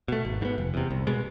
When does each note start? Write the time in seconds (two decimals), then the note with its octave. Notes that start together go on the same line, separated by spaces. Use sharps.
0.08 B2 A3
0.25 G#1
0.41 G#2 E3
0.45 B3
0.58 F1
0.74 E2 C3
0.91 C2
1.07 B2 G#3 B3